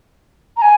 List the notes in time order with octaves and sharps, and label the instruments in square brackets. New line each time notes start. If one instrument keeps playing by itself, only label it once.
[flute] A#5
G#5